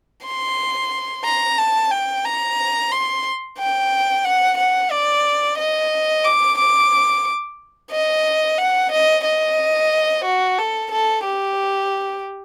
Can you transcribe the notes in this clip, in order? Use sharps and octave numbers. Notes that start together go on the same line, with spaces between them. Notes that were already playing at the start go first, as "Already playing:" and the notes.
C6
A#5
A5
G5
A#5
C6
G5
F#5
F#5
D5
D#5
D6
D6
D#5
F#5
D#5
D#5
F#4
A4
A4
G4